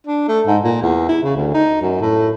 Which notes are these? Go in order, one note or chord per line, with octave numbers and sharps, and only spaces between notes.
D4
A3
G#2
A#2
E2
E4
C#3
D2
D#4
F#2
A2